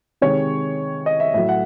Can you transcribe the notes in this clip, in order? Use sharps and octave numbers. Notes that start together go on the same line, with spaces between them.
C3 D#3 G#3 C#5
D#5
E5
A2 F#3 E5
F#5